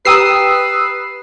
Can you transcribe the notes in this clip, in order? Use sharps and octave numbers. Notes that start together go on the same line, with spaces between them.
G4 B4 G5 A#5 D#6 E6 C7